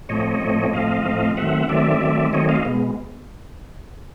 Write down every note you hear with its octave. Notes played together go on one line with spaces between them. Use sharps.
A2 F3 A3 C4 C#5 D#5
A2 F3 A3 C4
A2 F3 A3 C4 D#5 F5
A2 F3 A3 C4
D#3 F#3 A3 C4 E5 F#5
D#3 F#3 A3 C4 D5 E5
D#3 F#3 A3 C4
D#3 F#3 A3 C4 C#5 D#5
D#5 F5
B2 G#3 B3